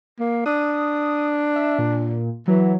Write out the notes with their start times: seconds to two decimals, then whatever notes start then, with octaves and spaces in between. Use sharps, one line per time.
0.20 A#3
0.46 D4 D#6
1.56 E5
1.79 A#2
2.48 E3 F#3